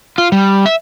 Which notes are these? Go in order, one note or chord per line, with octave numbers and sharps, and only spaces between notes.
F4
G3
E5